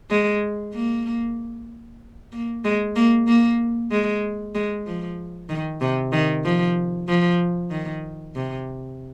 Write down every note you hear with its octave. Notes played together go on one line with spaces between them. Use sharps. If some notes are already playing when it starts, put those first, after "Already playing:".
G#3
A#3
A#3
G#3
A#3
A#3
G#3
G#3
F3
D#3
C3
D#3
F3
F3
D#3
C3